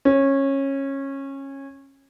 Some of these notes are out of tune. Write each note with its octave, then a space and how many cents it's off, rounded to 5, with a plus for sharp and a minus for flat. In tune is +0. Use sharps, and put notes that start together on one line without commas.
C#4 -20